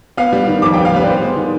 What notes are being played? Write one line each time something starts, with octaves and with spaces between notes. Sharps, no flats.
B3 F5
G3
D#3
F2 D6
G5
B3
F5
G3 B4
D5
B3 C5
G#3
D#3